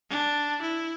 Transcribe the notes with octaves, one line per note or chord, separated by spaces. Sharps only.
D4
E4